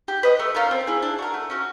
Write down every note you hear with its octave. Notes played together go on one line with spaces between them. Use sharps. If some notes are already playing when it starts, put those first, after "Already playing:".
G4
B4 D#5
A3
C#4 F4 A#4
C4
E4 G#4
D4
F#4 A#4
A3
C#4 F#4